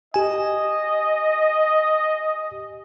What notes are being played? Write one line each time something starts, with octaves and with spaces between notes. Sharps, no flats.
G4 D#5 G#5